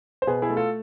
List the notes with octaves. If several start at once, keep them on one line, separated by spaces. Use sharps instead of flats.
C5
B2 G#4 B4
E4 G#4
A3
F4 A4